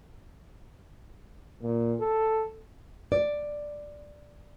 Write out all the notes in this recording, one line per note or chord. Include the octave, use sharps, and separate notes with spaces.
A#2
A4
D5